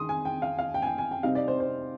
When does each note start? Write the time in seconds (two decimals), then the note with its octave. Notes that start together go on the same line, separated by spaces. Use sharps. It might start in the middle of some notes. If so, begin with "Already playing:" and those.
Already playing: D#3 G#3 C6 D#6
0.09 G#5
0.25 G5
0.42 F5
0.59 F5
0.74 G5
0.82 G#5
0.87 G5
0.98 G#5
1.11 G5
1.23 C3 G3 C4 D#4 F5
1.35 D5
1.48 C5
1.60 C5